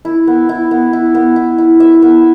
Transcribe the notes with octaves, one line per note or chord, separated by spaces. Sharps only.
E4
B3
E4
B3
E4
B3
E4
E4
E5
B3